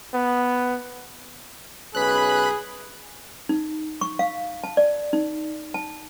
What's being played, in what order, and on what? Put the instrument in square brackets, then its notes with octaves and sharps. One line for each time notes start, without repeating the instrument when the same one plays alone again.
[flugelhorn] B3
[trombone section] B1 C#4 B4 [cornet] G#4 [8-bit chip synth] B5 F#6
[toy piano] D#4
C#6
F5
A5
D5
D#4
A5